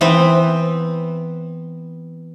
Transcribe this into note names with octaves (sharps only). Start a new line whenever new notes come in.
E3 B3 C4